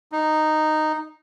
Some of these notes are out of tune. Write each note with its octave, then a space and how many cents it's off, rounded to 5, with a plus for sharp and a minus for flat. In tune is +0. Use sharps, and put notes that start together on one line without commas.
D#4 -10